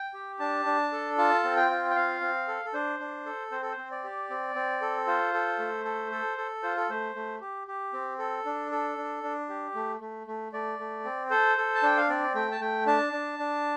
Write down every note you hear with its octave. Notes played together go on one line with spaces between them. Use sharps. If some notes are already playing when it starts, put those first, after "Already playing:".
Already playing: G5
G4
D4 A5
D4
A4
F4 A5
C4
G5
F4
G5
C4 F5
C4
A4
A4
D4 C5
D4
A4
C4 C5
A4
C5
C4
D5
G4
C4
C4
A4
F4 C5
A4
A3
A4
A4
A4
F4 C5
A4
A3 C5
A3
G4
G4
C4
A4
D4
A4
D4
D4
G4
A3
A3
A3
A3 D5
A3
C4
A4 C5
A4
A5
D4 G5
F5
C4 D5
A3 G5
A5
A3 G5
D4 A5
D4
D4